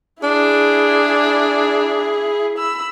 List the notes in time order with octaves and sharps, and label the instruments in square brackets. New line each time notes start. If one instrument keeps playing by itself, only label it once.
[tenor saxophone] D4 [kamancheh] E4 G#4
[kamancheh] B5 E6